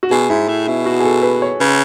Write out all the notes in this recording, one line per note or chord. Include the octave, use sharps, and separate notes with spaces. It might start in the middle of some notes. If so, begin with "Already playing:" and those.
F#4
B2 G#4
G#2 E4
A2
B2 E4
F#4
G#4
A4
B4
C#5
C#3 B4